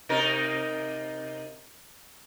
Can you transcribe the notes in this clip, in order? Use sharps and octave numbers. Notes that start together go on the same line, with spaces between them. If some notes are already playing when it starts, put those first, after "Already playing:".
C3 D#4 A#4